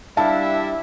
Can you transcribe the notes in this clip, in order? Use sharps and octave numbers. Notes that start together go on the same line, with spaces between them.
G3 D4 E4 E5 F5 A5